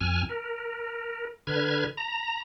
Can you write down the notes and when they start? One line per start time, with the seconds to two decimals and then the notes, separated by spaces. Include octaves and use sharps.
0.01 F2 G#5 F6
0.29 A#4
1.47 D3 B4 F6 G#6
1.97 A#5